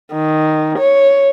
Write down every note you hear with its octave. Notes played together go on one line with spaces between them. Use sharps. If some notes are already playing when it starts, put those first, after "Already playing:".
D#3
C#5